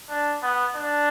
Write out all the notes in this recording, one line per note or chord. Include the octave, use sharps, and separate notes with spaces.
D4
B3
D4